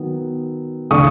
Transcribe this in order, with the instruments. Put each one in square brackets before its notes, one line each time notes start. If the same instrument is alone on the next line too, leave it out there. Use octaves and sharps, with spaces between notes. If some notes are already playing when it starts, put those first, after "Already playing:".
Already playing: [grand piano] D#3 F#3 B3
C#3 E3 A3 D4 C#6 D#6